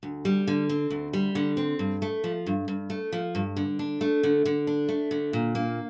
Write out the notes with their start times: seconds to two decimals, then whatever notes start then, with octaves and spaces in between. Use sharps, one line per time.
0.03 D2
0.25 G3
0.47 D3
0.69 C4
0.90 D2
1.13 G3
1.35 D3
1.57 C4
1.79 G2
2.02 A3
2.24 F3
2.46 G2
2.68 G2
2.90 A3
3.12 F3
3.35 G2
3.56 D3
3.79 D4
4.01 A3
4.23 D3
4.46 D3
4.67 D4
4.89 A3
5.11 D3
5.33 A#2
5.55 A#3